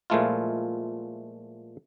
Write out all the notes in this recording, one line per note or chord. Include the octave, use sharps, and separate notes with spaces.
A#2 F3 G#3 A3 E4 F4